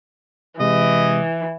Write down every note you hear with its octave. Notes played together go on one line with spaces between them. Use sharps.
C3 E3 G#3 D#5